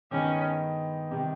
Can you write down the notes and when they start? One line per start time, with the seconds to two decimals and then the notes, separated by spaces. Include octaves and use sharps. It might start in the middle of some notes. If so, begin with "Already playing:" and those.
0.11 G2 D#3 G#3 B3 C#4 D#4
1.11 C3 D#3 G3